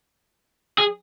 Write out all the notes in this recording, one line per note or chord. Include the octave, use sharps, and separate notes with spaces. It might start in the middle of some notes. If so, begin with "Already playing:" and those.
G#4